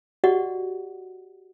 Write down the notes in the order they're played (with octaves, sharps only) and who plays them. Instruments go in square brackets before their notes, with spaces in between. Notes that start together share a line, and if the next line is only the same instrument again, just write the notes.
[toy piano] F#4 G4 D5 D#5 F#5